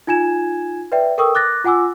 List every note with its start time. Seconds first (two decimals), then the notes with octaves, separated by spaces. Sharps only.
0.07 D#4 F4 G#5 G#6 E7
0.92 B4 D5 E5 G5
1.18 A4 A#4 G5 C#6 D#6 E6
1.35 D6 F#6 A6 A#6
1.64 F4 F#5 G#5 D6 E6